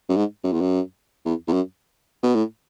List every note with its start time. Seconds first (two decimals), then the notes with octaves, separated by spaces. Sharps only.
0.09 F#2
0.16 G#2
0.44 F#2
0.53 E2
0.61 F#2
1.25 E2
1.48 E2
1.53 F#2
2.23 B2
2.35 A2